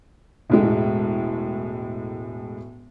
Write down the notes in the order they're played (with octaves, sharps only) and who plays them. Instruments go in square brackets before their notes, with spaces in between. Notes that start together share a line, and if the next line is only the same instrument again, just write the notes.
[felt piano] E1 A2 G#3